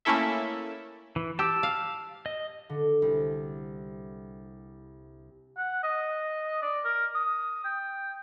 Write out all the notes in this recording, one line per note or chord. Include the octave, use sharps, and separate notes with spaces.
A3 A#3 C#4 E4 A4 E5
E3
G4 A5 E6
F5
D#5
D3
C2
F#5
D#5
D5
A#4
D#6
G5